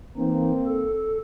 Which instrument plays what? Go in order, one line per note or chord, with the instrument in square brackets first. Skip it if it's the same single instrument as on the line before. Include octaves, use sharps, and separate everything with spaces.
[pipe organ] E3 D#4 [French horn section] A#3 C4
[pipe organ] A4